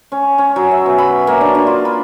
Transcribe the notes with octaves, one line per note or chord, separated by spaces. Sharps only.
C#4
C#4
F#3
E5
B2
B5
A#3
D4
D4
F4
B5